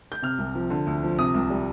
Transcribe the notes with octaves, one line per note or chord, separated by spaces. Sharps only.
G6
C3 F6
C2
F3
D3
D2
F3
C3 D#6
C2
G3